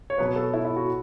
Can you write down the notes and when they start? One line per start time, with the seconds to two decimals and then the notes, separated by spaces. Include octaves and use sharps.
0.10 C#5
0.18 B2 F#3 B3 B4
0.36 A4
0.54 E4
0.65 E4
0.76 F#4